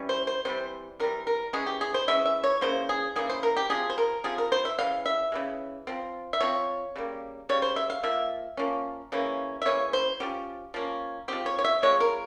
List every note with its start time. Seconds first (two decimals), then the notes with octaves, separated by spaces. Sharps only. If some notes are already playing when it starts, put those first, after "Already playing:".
Already playing: E3 G3 C#4
0.09 C5
0.27 C5
0.45 C3 E3 G3 C5
1.00 C3 E3 G3 A#4
1.27 A#4
1.53 E3 G#3 C#4 G#4
1.66 G4
1.81 G#4
1.94 C5
2.08 E3 G#3 C#4 E5
2.25 E5
2.44 C#5
2.61 C#3 E3 A#3 C5
2.89 G#4
3.16 C#3 E3 A#3 G#4
3.29 C5
3.43 A#4
3.57 G4
3.70 C3 F3 C4 G#4
3.90 C5
3.98 A#4
4.24 C3 F3 C4 G#4
4.38 A#4
4.52 C5
4.65 E5
4.79 C#3 E3 F5
5.06 E5
5.32 C#3 E3 G#3
5.87 F3 C4
6.33 E5
6.40 F3 C4 C#5
6.96 C#3 G3 A#3
7.49 C#3 G3 C#5
7.62 C5
7.76 E5
7.90 F5
8.03 F3 A#3 E5
8.57 F3 A#3 C#4
9.12 C#3 E3 A#3 C#4
9.62 E5
9.65 C#3 E3 A#3 C#4 C#5
9.93 C5
10.20 F3 A#3 C#4 G4
10.74 F3 A#3 C#4
11.28 F3 G#3 C4 G4
11.46 C#5
11.59 C#5
11.64 E5
11.82 F3 G#3 C4 C#5
12.00 A#4